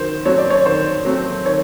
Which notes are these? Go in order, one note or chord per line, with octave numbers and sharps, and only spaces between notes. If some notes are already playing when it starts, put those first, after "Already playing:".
Already playing: D#3 F#3 C5
F#3 A3 C4 C#5
D5
C#5
D#3 C5
F#3 A3 C4
D#3 C#5